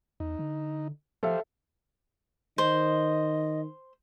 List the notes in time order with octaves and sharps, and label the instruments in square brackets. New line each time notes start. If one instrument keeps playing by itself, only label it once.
[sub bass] E2 [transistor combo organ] D#4
[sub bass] D3
[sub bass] F3 [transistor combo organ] G4 C5 F5 [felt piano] A4 E5
[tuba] D#3 [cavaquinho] C5 [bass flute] D#5